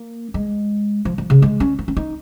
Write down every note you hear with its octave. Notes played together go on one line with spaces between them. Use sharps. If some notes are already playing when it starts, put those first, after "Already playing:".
Already playing: A#3
G#3
F3
F3
C#3
G#3
C#4
D#4
C#4
D#4